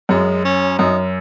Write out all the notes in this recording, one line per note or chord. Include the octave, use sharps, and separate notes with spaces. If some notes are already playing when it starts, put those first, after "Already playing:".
F#2 G#3
C#4
F#2 D#4